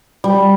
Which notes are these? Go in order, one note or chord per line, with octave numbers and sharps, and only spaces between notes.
G3